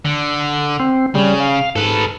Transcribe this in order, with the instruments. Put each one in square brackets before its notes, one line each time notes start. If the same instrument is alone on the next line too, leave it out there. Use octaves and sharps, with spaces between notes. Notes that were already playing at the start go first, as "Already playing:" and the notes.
[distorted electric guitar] D3
[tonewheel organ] C4
[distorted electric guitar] C#3 [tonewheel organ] G3
[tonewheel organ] F5
[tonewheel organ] G#2 [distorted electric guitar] A4 B4